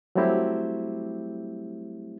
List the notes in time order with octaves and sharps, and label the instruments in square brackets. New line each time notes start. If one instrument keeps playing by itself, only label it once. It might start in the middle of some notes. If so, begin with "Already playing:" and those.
[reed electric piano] F#3 G3 A3 C4 E4 G4